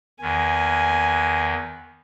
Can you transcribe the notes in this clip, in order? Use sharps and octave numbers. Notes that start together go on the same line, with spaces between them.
E2 D#3 G#5